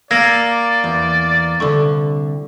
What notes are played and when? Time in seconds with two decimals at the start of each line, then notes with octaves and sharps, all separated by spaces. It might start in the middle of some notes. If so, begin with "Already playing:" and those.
0.11 A#3 D5 E6 G#6 A#6
0.84 E2
1.60 C2 D3 A4 C#6